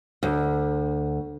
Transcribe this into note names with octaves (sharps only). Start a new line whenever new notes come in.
D2